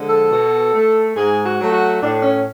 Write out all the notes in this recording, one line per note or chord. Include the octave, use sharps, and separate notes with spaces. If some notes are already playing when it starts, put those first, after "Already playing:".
Already playing: D3 F3 G#3
A4
B2
A3
G#2 G#4
F#4
F#3 A3
F#4
A2 D4
C#4